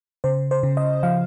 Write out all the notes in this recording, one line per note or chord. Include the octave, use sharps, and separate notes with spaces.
C#3 C5
C5
C#3
D#5
F3 F5